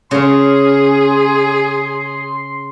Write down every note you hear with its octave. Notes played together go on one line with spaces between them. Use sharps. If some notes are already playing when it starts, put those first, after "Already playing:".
C#3 C#4 G#4 C6